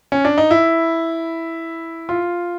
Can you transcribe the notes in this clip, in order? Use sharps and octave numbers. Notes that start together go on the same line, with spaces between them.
C#4
D4
D#4
E4
F4